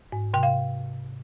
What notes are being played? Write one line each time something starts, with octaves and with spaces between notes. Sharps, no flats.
G#2
C3 G5
F5